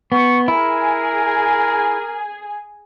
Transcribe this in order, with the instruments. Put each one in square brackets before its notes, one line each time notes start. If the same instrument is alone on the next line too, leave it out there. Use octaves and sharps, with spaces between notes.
[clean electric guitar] B3 [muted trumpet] C#6
[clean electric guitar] E4 [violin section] G#4 G#5 [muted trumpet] A#4